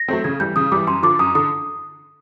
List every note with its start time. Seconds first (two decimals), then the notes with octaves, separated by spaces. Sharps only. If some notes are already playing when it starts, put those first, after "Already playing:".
Already playing: A#6
0.08 F#3 A3 C4
0.24 C#3 G#6
0.40 E3 G3 G6
0.56 C#3 D#6
0.72 E3 G3 D6
0.87 F#2 C6
1.03 D3 F3 D6
1.19 F#2 D#6
1.35 D3 D#6